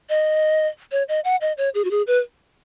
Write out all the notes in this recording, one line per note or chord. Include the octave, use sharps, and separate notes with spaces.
D#5
C#5
D#5
F#5
D#5
C#5
G#4
F#4
G#4
B4